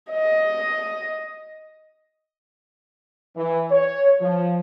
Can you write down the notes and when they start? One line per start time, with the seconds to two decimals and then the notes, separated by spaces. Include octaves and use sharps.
0.11 D#5
3.36 E3
3.71 C#5
4.21 F3